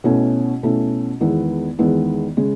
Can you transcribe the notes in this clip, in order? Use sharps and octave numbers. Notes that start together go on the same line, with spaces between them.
B2 A3 C#4 E4
B2 A3 C#4 E4
E2 D#3 G#3 B3 E4
E2 D#3 G#3 B3 E4
C#3 G#3